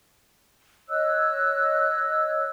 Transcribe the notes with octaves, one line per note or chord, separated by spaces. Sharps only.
C#5 D#5 E6 F#6